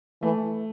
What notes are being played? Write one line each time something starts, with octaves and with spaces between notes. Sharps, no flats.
E3 A3